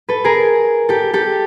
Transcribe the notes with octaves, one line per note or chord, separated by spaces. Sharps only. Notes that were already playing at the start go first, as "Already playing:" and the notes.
A4 B4
G#4 A#4
G4 A4
G4 A4